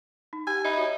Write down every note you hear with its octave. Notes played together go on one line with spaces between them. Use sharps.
D#4
G4 G#5
D#4 D#5 E5 B5
F#4 C#5